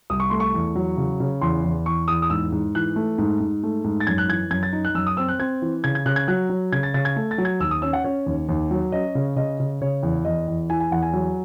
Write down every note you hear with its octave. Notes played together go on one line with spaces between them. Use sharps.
C2 D#6
C#6
A3 C6
C#6
E2
F#3
C#3
C#3
E2 C6
E2
E2 C#6
E2 D#6
D#6
G#2 E6
G#2
E3 F#6
A3
G#2
G#2
A3
G#2
A6
F#2 G#6
F#6
E3 G#6
F#2 G#6
A6
D#4
F#6
F#2 E6
D#6
C4 E6
F#6
C4 G#6
E3
C#3 G#6
G#6
C#3 F#6
G#6
F#3 F#6
F#3
C#3 G#6
A6
C#3 A6
G#6
A3
A6
F#3
G#6
D#2 E6
D#6
C#4 E6
F#5
C#4 C#5
D#2
D#2
F#3
C#4 D#5
C#3
C#3 D#5
C#3
C#3 C#5
E2
E2 D#5
E2
E3 G#5
G#5
E2 F#5
G#5
F#3